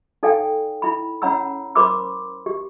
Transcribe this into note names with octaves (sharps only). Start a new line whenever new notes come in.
D#4 A4 D5 F5 G5 G#5
E4 B5
C#4 C#5 F#5 A#5 B5 E6
A#4 C5 B5 C6 D6 E6
G4